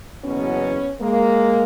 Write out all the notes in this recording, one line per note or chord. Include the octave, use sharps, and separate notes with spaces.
F#1 E2 B2 F#3 B3 C#4
G#3 A#3